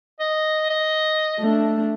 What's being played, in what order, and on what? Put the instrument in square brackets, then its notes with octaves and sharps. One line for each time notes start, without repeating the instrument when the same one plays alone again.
[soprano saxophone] D#5
D#5
[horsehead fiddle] A3 D4